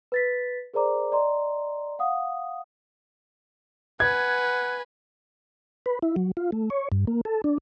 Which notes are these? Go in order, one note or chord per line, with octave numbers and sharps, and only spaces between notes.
B4 A6 B6
G#4 A#4 C5 D5 A#5 D6
D5 D#5 A#5 C6
F5 F#5 D#6
B4 F#5 G#5 G#6
B4
E4
F#3
F4
A3
C#5
G2
A#3
A4
D4